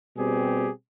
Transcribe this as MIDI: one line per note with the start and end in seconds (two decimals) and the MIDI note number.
0.17 0.69 47
0.17 0.69 55
0.17 0.69 60
0.17 0.69 67
0.17 0.69 68